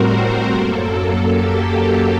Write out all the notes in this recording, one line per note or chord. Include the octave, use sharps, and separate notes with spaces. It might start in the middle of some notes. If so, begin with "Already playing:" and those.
Already playing: A2 G3 C4 F#4 A#4 C5
F#2 F#3 A#3 A4
G4